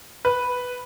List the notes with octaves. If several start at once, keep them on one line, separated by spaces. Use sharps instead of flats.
B4